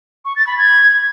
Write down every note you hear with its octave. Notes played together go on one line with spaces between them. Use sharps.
C#6
A6
B5
G#6